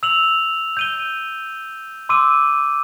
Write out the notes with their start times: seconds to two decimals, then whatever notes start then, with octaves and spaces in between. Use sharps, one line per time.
0.03 E6 F7 F#7
0.77 G6 D#7 G7
2.09 C6 D6 E6 D#7